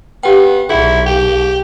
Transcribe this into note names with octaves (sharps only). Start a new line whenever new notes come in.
B3 G4 G5
B1 E4 G#4
G4